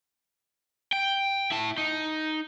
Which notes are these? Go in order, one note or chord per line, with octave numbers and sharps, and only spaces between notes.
G5
E4 A5
D#4